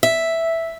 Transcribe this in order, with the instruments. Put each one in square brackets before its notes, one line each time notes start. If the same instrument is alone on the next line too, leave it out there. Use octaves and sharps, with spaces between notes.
[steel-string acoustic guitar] E5